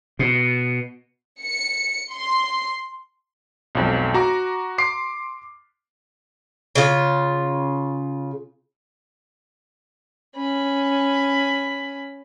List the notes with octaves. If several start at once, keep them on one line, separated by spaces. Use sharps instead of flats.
B2
C#7
C6
B1 F2 G#3
F#4 A#5 D6
C6 D6 C7
C#3 F4
C#4 B5